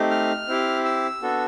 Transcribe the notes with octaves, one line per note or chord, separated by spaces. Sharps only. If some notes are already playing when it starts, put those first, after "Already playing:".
Already playing: A3 C4 D#4 G4
F6
C4 E4 G4
E6
B3 D4 F#4 A4